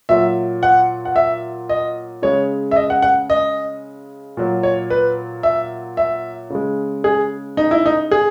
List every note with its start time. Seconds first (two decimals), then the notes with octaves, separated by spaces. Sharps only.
0.09 A#2 F#3 E5
0.63 F#5
1.05 F#5
1.16 E5
1.69 D#5
2.22 C#3 G#3 C#5
2.71 E5
2.76 D#5
2.90 F#5
3.02 F#5
3.30 D#5
4.37 A#2 F#3
4.63 C#5
4.90 B4
5.43 E5
5.97 E5
6.50 C#3 G#3
7.04 G#4
7.57 D#4
7.71 E4
7.86 D#4
8.11 G#4